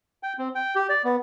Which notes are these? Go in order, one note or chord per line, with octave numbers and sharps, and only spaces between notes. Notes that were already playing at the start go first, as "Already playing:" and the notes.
G5
C4
G5
G4
D5
B3